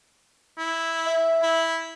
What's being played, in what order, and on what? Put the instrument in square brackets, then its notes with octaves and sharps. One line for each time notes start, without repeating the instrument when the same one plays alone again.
[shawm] E4
[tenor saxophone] E5
[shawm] E4